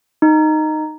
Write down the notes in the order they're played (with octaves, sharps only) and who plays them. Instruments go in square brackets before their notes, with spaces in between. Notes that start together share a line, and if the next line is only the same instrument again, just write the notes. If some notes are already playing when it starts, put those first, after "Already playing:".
[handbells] D#4